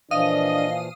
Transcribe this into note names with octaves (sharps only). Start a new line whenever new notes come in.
A#2 E3 F3 D4 D#5 F5 D#6 D#7